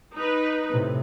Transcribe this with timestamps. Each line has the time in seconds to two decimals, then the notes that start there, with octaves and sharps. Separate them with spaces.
0.15 D#4 B4
0.71 A2 C3